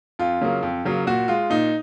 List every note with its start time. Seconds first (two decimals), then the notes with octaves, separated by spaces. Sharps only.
0.19 F2 F4
0.41 C#3 F#3 A#3
0.63 F2
0.85 C#3 F#3 A#3
1.07 A#2 F#4
1.28 G#3 F4
1.50 A#2 D#4